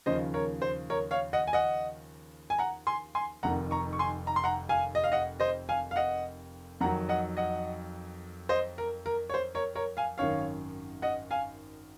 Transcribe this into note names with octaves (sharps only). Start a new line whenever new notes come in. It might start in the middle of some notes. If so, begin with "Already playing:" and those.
D#2 C#3 F3 C5 D#5
A#4 C#5
C5
A#4 C#5
C#5 F5
D#5 F#5
G#5
D#5 F#5
G#5
F#5 A#5
G#5 C6
G#5 C6
F1 F2 C3 D#3 F#5 A#5
A#5 C#6
C#6
G#5 C6
A#5
C6
F#5 A#5
F5 G#5
D#5
F5
D#5 F#5
C5 D#5
F5 G#5
F5
D#5 F#5
F2 D#3 F#3 F#5 A#5
D#5 F#5
D#5 F#5
C5 D#5
A#4
A#4
C#5
C5
A#4 C#5
A#4 C#5
F5 G#5
G#1 F#2 D#3 C#5 F5
D#5 F#5
F5 G#5